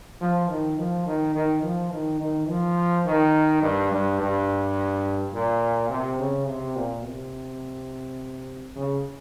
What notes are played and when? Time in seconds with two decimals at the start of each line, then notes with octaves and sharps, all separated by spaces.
0.21 F3
0.49 D#3
0.78 F3
1.06 D#3
1.35 D#3
1.63 F3
1.92 D#3
2.21 D#3
2.48 F3
3.06 D#3
3.62 G2
3.91 G2
4.20 G2
5.34 A#2
5.90 C3
6.20 C#3
6.48 C3
6.76 A#2
7.04 C3
8.76 C#3